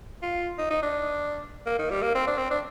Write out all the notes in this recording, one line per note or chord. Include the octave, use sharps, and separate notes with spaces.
F4
D#4
D#4
D4
A#3
D#3
G3
A#3
C4
D4
C4
D4